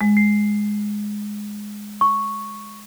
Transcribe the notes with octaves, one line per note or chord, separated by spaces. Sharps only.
G#3
C7
C#6